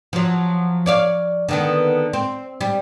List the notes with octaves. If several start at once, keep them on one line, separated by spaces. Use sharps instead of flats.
F3 F#3
C#5 D5 F5
D3 D#3 B3
C4
G3